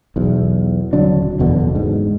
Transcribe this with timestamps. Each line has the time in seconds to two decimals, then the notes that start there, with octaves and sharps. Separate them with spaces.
0.16 B1 E2
0.93 D#1 D3 F#3 D4
1.39 F#1 E2 B2 D3
1.75 G#2